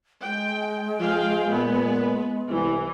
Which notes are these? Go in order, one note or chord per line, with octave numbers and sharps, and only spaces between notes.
G#3 G5
F3 G#4 F5 G5
A#2 B3 B4
C2 E3